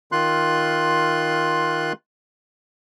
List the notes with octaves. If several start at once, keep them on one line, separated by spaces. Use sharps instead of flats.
D#3 F4 C6 F#6